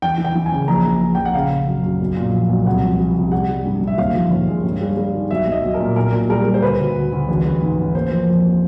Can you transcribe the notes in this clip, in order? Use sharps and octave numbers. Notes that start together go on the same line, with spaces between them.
E3 G5
E3
G5
E3
G#5
C#3
A#1 A#5
A#1
A#1
A#1 G5
F#5
C#3 F5
C#3
F#2
F#2
B1
A#2
F3
B1
C2 F#5
F3
F3
C3
G3 F#5
G3
G2
G2
E5
D#2 F5
F3
D#2
G#3
G2
G3
G3
D#3
B1 E5
B1 D#5
B1
A#4
A#2
B1 A#4
A#2
G3 A#4
G3
C5
D2 B4
D2
D2
D2
A1
A1
G#2
A1
A#3 C5
F3
F2
A#3